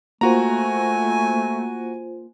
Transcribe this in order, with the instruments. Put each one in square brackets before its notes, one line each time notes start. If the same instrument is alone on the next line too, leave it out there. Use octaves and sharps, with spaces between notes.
[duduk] A3 [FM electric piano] A#3 F4 C5 [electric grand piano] F#4 A#5 [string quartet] G#5